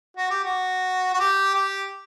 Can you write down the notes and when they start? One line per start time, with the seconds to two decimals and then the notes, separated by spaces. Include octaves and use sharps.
0.17 F#4
0.30 G4
0.44 F#4
1.14 F#4
1.20 G4
1.54 G4